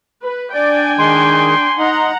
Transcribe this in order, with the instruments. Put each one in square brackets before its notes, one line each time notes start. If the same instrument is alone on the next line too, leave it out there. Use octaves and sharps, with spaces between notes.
[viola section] B4
[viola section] D4 G5 G#5 [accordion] D5
[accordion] D#3 G#3 [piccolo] C6
[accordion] D#4 [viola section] F#5 A#5